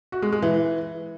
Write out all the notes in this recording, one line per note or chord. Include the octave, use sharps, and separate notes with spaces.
F#4
G#3
G#3
E3